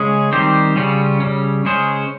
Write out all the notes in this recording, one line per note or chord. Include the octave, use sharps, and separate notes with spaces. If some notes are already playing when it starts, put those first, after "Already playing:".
Already playing: C#3 G#3 C#4 G#4
D#3 G3 C4 G4 C5
C#3 G3 C#4 F4
C#3 G3 C#4
C#3 G#3 C#4 G#4 C5